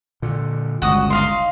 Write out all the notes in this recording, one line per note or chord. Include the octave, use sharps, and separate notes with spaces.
A#2 D3
G1 C#2 F#4 D#6
D#4 F5 C6